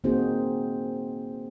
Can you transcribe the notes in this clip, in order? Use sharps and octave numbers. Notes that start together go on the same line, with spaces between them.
A#3 C4 D#4 F#4 G#4 C5